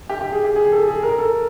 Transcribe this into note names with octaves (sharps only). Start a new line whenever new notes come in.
G4
G4
G#4
G4
G#4
A4
G#4
A#4
A4